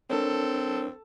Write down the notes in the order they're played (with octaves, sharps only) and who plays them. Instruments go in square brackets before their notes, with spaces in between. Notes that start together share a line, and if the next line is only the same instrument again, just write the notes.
[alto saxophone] C4 [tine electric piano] D4 A#4 C#5 [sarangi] A4